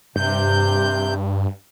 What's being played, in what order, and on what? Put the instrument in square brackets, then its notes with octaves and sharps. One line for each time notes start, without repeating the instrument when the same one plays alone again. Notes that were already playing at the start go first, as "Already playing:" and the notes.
[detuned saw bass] G2 [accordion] C3 G6